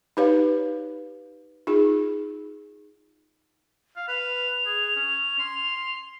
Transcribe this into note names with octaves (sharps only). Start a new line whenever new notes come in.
D#4 G4 B4 C#5 F5
D#4 F4 G#4
F5
B4 F7
G#4
C#4
C6